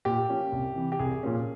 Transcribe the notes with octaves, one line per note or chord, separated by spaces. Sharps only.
A#2 G4
F3 A#3 C#4
C2
C3 E3
G4
C2 G#4
A#2 F3 A#3 C#4